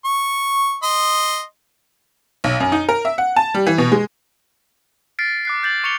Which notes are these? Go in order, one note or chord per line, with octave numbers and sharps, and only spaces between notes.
C#6
D#5 C6
B1
F#2
D#4
A#4
E5
F#5
A5
G3
E3
B2
G#3
F6 A6 B6 C7 D7
D6 F#6 C7
G6 A6 F#7
C#6 C#7 F7 G7